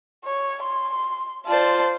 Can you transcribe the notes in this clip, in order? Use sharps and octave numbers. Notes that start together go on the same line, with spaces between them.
C#5
C6
F4 C5 D5 A5